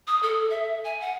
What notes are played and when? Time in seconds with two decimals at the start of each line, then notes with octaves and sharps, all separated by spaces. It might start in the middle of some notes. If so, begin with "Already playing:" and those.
0.07 D#6
0.23 A4
0.50 E5
0.84 G#5
1.01 F#5